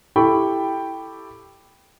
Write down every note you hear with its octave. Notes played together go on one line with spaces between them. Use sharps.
E4 G4 A4 G5 B5 C#6